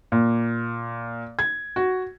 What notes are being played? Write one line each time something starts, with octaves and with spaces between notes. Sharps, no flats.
A#2
G#6
F#4